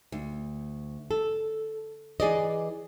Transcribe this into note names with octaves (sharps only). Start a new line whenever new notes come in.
D2
A4
E3 G#4 D5 D#5